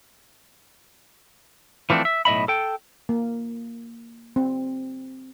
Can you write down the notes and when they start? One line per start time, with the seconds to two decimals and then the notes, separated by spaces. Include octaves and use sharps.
1.90 E3 F3 A3 C4 D4
2.05 E5
2.25 B1 A2 D#5 E5 B5
2.48 A4 G5
3.09 A#3
4.36 C4